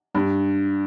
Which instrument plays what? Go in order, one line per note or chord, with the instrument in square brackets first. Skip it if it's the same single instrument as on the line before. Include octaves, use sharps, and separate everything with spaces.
[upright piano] G2